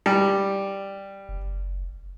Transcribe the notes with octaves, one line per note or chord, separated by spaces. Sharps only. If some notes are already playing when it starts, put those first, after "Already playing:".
G3
F#1